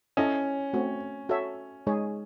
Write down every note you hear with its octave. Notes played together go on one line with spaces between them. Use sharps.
C#4 E4 A4 D#5
A3 C4 F#4
F#4 A4 C#5 E5
G#3 D#4 G#4 C#5